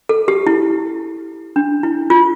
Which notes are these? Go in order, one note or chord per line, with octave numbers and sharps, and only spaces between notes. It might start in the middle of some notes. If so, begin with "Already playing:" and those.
A4
G4
E4
D4
E4
F4